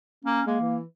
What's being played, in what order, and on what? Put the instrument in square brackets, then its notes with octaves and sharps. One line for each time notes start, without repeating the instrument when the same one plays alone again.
[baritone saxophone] A#3 [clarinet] C#4
[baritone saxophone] G#3 [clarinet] A#3
[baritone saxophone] E3